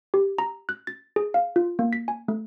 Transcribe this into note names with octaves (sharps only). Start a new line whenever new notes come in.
G4
A#5
F#6
A6
G#4
F5
F4
A#3
B6
G#5
A3